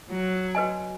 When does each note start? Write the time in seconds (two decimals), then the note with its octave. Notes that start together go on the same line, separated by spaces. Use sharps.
0.10 F#3
0.55 F#4 B4 D#5 G#5